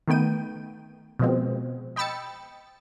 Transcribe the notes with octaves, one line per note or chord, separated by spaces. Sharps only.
D#3 A3 B3 G5 D#7
B2 F3 G#3 C4
D#5 G5 B5 E6 A6 C#7